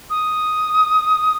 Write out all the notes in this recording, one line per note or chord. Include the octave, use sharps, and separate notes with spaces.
D#6